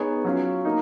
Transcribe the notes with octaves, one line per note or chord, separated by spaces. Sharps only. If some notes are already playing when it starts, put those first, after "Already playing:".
Already playing: B3 D#4 G#4 C#5
F#3 C#4 F4
A#3 D#4